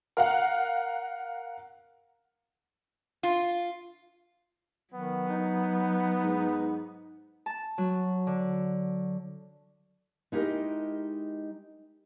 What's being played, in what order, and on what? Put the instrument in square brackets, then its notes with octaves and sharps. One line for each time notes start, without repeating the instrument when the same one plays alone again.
[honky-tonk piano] A#4 F5 F#5
[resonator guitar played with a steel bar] F4
[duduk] D#3 [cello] F#3 [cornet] B3
[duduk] D#4
[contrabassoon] G#2
[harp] A5
F#3
D3
[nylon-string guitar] G#3 D#4 E4 G4 A#4 D#5